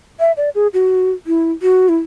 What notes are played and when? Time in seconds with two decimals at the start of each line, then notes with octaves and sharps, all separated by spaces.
0.20 E5
0.37 D5
0.55 G#4
0.74 F#4
1.27 E4
1.62 F#4
1.89 E4